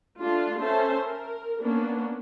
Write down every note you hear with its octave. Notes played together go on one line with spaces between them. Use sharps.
A3 D4 F4
C#4 A4 C5 E5 A5
A#4
A#3 B3 C#4 D4